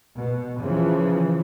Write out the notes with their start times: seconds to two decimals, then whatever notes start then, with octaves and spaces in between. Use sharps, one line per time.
0.18 B2
0.61 C#3 E3 F3